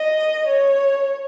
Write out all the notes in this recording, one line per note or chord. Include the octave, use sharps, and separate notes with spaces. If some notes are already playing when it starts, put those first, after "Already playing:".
Already playing: D#5
C#5